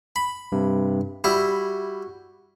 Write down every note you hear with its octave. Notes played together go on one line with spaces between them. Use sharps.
B5
G2 C3
G3 E4 F#4